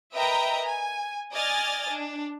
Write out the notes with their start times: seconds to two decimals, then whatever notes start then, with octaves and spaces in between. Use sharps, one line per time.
0.15 A#4 B4 D#5 E5 G5 A#5
0.65 G#5
1.33 D5 D#5 G#5 F6 A6
1.88 D4